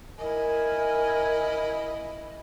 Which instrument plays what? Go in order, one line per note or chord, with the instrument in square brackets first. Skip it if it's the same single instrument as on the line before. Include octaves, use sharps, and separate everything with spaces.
[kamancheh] E4 D#5 [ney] A#4 [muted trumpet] G#5